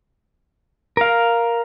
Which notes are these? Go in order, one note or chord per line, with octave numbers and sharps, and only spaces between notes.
A#4 F5